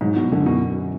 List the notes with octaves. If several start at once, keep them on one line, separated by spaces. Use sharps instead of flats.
G#2 F#3
B2
F#2 D3
B2